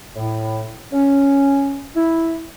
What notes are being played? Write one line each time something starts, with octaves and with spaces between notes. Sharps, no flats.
A2
C#4
E4